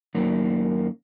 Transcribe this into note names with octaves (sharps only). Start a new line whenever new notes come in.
F#2 D#3 A#3